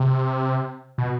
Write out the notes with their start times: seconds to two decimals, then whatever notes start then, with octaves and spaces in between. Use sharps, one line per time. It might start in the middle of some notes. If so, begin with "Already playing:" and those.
Already playing: C3
0.98 B2